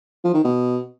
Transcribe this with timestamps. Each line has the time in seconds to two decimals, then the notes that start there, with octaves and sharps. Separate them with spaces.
0.24 F3
0.34 D#3
0.44 B2